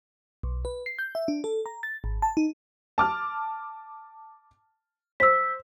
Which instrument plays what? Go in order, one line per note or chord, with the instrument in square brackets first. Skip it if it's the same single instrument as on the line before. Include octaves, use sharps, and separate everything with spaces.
[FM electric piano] B1
B4
C7
G6
E5
D4
A4
A#5
A6
G#1
A5
D#4
[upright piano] A5 D6 F6
[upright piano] C5 [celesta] E6 B6